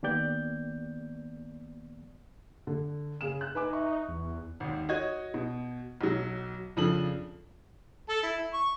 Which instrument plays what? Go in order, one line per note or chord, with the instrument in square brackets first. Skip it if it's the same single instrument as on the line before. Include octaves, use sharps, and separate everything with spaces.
[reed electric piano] D#3 A#3 B3 G4 D5 G6
[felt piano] D3
C#3 G#4 E7
F#6
[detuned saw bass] D#4 [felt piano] B4 G#5 D6
[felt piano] E5 C#6
[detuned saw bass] E2
[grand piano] G#1 D#2
F#4 C#5 D#5 G#6
B2
B1 F#3
F2 C#3 F3 D4 A4 F#7
[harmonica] A4
E4
E4
C#6